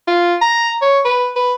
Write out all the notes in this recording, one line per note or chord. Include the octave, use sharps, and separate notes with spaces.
F4
A#5
C#5
B4
B4